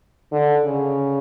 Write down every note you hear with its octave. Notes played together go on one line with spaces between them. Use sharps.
D3
C#3